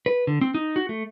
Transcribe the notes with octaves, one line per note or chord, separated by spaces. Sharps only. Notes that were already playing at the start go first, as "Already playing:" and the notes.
B4
D3
C4
D#4
F#4
A3